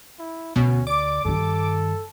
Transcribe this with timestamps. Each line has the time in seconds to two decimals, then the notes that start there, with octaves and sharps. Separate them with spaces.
0.19 E4
0.56 D2 B2 C#4
0.87 D5 D6
1.25 G2 D#3 A4